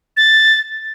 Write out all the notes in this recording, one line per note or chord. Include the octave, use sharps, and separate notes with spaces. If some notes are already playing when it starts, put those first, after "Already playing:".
A6